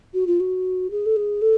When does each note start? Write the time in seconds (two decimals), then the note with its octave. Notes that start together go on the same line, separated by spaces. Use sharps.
0.14 F#4
0.27 F4
0.40 F#4
0.91 G#4
1.06 A4
1.16 G#4
1.42 A4